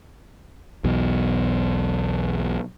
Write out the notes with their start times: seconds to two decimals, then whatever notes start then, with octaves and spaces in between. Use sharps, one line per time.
0.84 B1 E2 B2